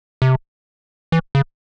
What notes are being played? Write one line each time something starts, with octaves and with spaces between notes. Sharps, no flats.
C3
E3
C#3